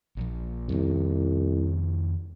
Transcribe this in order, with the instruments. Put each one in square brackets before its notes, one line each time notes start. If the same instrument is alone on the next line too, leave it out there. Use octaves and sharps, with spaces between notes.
[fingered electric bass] A#1 F3
[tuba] C2 [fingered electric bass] F2 D#3